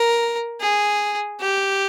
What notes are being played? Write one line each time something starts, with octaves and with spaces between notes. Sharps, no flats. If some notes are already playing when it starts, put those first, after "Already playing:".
Already playing: A#4
G#4
G4